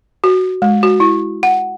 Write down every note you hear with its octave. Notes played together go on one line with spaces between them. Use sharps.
F#4
G#3
F#4
E4
F#5